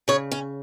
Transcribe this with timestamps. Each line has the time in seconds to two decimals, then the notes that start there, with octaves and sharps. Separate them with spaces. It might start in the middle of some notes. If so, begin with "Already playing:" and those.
0.08 C#3 G#4 C#5
0.32 C#4